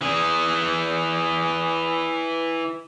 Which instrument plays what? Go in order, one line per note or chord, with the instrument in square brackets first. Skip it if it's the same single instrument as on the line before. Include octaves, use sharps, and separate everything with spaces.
[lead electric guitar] E3 G#4